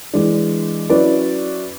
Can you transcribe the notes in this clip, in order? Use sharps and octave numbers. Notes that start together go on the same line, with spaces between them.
E3 G#3 D4
F#3 C#4 E4 B4 D5